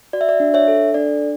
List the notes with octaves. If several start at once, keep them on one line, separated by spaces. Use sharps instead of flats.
F#4 D5
E5
D5
D4
C#5 E5
A4
D4 D5